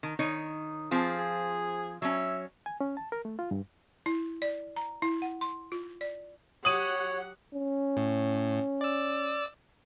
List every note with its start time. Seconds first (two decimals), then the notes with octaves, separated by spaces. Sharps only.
0.03 D#3
0.19 D#3 D#4 C#5
0.91 F3 C4 F4 G#4
1.17 G#4
2.02 F#3 C#4 E5
2.66 G#5
2.81 C#4
2.97 A5
3.12 A#4
3.25 A3
3.39 F4
3.51 G2
4.06 E4
4.42 D5
4.76 A#5
5.02 E4
5.22 F#5
5.41 C6
5.72 F4
6.01 D5
6.65 F#3 G4 C#5 F#5 D#6 D#7 F#7
7.54 C#4
7.97 A2
8.81 D5 E6